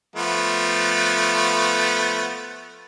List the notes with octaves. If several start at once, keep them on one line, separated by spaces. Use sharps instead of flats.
F3 A3 B3